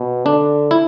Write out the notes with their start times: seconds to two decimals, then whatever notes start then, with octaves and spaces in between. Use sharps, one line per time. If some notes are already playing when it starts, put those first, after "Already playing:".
Already playing: B2
0.26 D3 D4
0.71 E4